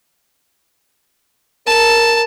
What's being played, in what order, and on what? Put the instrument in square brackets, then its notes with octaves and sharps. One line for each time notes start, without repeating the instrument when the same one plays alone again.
[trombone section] A#4 [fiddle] A5